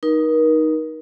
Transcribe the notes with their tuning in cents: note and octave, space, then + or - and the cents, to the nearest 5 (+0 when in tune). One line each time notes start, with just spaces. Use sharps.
D#4 +0 A#4 +35